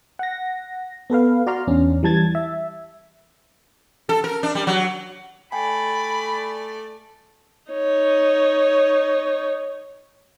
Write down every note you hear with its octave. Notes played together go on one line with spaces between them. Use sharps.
F#5 A#6
B3 A4 B4 F5
F#4 D5 A#5 C6 F6
E2 C#4 D4
E3 G3 A5 G#6 A6
E5
A4
A#4
D4
G3
F#3
A3 D5 G5 G#5 B5
D#4 C#5